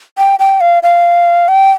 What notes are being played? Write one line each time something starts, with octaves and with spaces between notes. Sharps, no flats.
G5
G5
F5
F5
G5